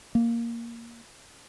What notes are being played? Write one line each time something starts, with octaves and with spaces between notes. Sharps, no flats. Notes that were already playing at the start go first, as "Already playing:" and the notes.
A#3